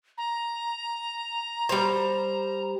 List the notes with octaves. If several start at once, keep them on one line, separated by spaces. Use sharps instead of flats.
A#5
G3 C5